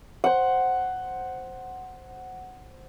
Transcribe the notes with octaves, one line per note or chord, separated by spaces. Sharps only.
C5 F#5